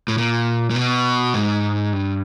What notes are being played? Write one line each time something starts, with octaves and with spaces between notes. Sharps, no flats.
A2
A#2
A#2
B2
G#2
G2